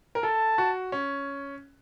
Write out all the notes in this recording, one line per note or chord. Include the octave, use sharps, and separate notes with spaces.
A#4
A4 A5
F#4
C#4